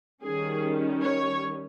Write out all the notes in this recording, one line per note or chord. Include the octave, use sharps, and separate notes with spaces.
D#3 G3 C#4 G#4
C#5